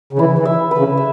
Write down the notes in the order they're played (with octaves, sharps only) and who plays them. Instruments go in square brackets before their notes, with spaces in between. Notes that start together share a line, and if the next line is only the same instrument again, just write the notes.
[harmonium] C#3
[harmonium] E3 [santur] E4
[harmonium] E3
[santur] E5
B4
[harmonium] C#3
[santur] E5